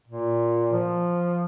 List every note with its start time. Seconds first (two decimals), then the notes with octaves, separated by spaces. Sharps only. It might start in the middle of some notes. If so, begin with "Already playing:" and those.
0.08 A#2
0.72 F3